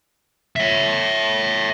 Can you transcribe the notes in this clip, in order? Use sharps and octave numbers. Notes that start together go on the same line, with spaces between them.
C#5 E5